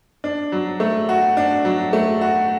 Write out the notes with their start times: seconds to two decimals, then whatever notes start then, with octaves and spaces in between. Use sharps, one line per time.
0.24 D4
0.52 F#3
0.80 A3
1.09 F#4
1.37 D4
1.65 F#3
1.93 A3
2.21 F#4